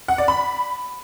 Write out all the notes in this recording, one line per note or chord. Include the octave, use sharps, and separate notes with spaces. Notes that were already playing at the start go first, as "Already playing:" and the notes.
F#5
D5
B5